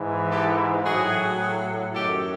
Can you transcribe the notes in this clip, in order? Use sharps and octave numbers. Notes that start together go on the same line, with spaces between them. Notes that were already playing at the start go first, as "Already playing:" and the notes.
Already playing: G#2 E3
G4 A4
A2 F#3 F#4 G#4
F#2 D#3 F#3 G4 A4